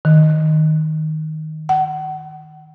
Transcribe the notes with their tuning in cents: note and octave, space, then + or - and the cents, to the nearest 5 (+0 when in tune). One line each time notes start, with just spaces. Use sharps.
D#3 +5
F#5 +30